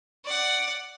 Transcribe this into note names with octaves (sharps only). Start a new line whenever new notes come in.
D5 F#5